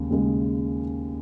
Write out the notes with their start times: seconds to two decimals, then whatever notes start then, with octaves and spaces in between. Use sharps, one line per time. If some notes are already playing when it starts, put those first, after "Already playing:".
Already playing: D#2 C#3 G#3
0.10 D#2 C#3 G#3